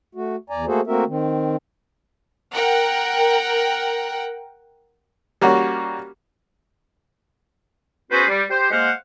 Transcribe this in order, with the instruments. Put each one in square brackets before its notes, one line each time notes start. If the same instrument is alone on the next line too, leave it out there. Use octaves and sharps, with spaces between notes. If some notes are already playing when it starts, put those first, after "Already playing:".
[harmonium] A3 F#4
E2 D5 G#5 A#5
A3 A#3 F#4 G#4 A4 C5
A3 A#3 C4 F#4 A#4 E5
D#3 C4
[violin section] A#4 F#5 G5
[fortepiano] G3 A#3 C#4 F#4
[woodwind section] B3 C#4 F#4 G#4 B4 C5
G3
G4 C5
G#3 A#3 C5 F5 F#5